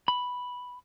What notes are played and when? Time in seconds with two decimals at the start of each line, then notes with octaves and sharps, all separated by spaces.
0.08 B5